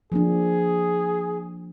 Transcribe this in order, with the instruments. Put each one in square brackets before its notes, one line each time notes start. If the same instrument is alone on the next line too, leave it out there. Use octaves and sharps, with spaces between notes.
[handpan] F3 A#3 D4 [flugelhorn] G#4